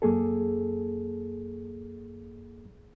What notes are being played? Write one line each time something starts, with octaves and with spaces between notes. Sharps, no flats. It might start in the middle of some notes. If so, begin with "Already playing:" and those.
F#2 A#3 G#4 A4